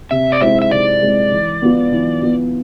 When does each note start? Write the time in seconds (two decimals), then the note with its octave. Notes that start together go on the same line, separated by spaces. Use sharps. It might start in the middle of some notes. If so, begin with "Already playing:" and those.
0.11 C3 E5
0.32 D5
0.41 G#3 C4 E4 E5
0.62 E5
0.70 C3 D5
1.01 G#3 C4 E4
1.32 E3
1.62 B3 F4
1.92 E3
2.22 B3 F4